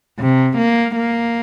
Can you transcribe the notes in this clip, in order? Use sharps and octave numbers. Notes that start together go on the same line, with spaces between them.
C3
A#3
A#3